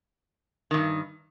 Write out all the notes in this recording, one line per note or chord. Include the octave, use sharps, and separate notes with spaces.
E2 G2 D#3